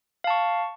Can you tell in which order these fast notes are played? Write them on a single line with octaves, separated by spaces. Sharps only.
F5 A5 C#6